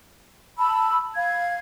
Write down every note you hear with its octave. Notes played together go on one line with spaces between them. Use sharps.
A5 B5 E6
F5 G#6